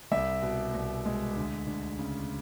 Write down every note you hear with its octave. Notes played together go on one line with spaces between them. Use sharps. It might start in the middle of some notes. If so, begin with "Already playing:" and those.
C2 E5
B2
C2
G#3
D2
D2
C#3